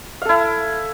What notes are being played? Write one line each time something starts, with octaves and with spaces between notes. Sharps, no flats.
E4 A4 F5